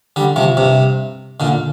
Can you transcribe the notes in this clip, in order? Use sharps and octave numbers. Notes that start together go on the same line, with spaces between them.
D3 G3
C3 F3
G2 C3
A#2 D3